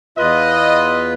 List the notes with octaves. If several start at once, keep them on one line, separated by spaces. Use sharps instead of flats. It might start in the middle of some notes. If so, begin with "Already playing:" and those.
E2 F4 B4 D#5